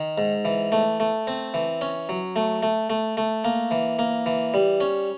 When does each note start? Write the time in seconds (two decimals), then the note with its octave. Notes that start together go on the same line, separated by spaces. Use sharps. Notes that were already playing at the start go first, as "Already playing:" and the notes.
Already playing: D#3
0.18 G#2
0.45 E3
0.72 A3
1.00 A3
1.27 C4
1.54 E3
1.81 C#4
2.09 F#3
2.36 A3
2.62 A3
2.90 A3
3.17 A3
3.44 A#3
3.71 E3
3.99 A#3
4.26 E3
4.54 G3
4.80 C#4